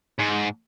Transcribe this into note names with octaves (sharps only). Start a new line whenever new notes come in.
G#2